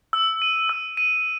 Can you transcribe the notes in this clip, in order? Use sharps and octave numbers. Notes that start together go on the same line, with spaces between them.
E6
D#7
E6
D#7